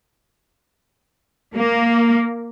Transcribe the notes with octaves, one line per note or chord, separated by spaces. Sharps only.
A#3